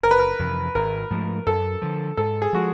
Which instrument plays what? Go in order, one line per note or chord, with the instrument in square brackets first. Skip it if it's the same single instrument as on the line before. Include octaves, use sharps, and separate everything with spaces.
[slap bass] F#1 [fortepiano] A#4
[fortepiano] B4
A#4
[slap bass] F2 C3 E3
[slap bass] G#1 [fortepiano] A#4
[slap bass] G#2 F3 A3
[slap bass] F#2 [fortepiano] A4
[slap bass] D3 F3
[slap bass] G#2 [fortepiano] A4
[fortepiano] G#4
[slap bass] F3 G#3 [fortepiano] F#4